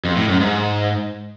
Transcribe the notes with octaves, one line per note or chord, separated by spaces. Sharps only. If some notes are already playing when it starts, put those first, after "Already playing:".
F2
A2
F#2
G#2